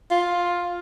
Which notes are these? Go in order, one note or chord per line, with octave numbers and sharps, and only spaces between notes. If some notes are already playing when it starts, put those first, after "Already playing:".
F4